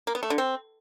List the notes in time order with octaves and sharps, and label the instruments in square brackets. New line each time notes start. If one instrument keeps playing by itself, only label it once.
[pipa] A#3
B3
A3
D3
C4